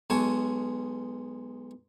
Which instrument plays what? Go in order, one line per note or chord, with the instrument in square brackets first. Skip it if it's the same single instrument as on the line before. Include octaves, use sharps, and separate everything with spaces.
[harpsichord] B1 B2 G#3 G#5 A5 C#6